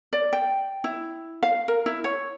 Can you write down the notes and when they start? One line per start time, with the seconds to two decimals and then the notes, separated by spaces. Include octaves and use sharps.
0.13 D5
0.33 G5
0.84 E4
1.43 F5
1.68 A#4
1.86 E4
2.04 C#5